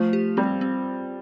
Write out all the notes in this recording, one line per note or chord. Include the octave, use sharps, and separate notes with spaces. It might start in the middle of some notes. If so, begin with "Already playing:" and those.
Already playing: F3 A3
G4
G3 C4
C4